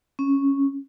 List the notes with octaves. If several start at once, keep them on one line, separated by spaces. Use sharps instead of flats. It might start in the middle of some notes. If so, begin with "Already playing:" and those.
C#4